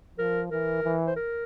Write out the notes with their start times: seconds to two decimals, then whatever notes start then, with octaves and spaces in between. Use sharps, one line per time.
0.18 F3 A#4
0.50 E3 A#4
0.84 E3
1.07 C5
1.16 A#4